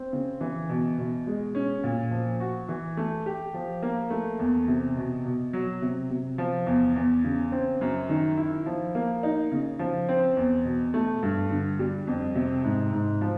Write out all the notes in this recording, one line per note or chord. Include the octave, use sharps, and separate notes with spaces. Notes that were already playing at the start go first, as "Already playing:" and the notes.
Already playing: C4
C#3
E3
B2
B2
G#3
C#4
A#2
F3
F#4
E3
A3
G4
F3
A#3
A3
E2
C3
B2
B2
F#3
C3
C3
F3
E2
E2
C#3
C4
F#2
D#3
E4
F3
A#3
D#4
C#3
F3
C4
E2
B2
A3
G2
D3
G3
F2
C3
G#2
G#2
F3